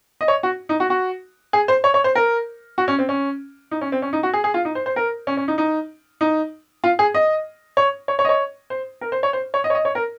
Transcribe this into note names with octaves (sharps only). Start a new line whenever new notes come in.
D#5
C#5
F#4
D#4
F#4
F#4
G#4
C5
C#5
C#5
C5
A#4
F#4
C#4
C4
C#4
D#4
C#4
C4
C#4
D#4
F#4
G#4
G#4
F4
D#4
C5
C5
A#4
C#4
C#4
D#4
D#4
D#4
F4
G#4
D#5
C#5
C#5
C#5
D#5
C#5
C5
A#4
C5
C#5
C5
C#5
D#5
C#5
D#5
C#5
A#4